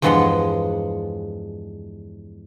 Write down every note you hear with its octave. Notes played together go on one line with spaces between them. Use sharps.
E2 G2 F3 G#3 F#5 C6